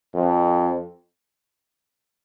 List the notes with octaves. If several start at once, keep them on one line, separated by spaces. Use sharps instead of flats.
F2